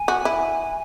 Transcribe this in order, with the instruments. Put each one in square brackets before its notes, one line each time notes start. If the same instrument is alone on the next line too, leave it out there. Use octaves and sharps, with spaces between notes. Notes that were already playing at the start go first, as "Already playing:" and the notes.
Already playing: [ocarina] G#5
[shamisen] F#4
E4